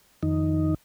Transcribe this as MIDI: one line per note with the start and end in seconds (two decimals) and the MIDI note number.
0.23 0.74 41
0.23 0.74 51
0.23 0.74 63